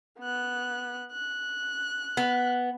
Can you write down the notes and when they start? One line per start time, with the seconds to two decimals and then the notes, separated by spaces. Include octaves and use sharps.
0.20 B3 F#6
1.12 F#6
2.17 B3